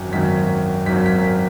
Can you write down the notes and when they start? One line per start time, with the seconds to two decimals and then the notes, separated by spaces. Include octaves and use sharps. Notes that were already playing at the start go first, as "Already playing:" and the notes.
Already playing: G#1 F#2 D#3 F#3
0.12 G#1 F#2 D#3 F#3 B6
0.86 G#1 F#2 D#3 F#3 B6
1.06 B6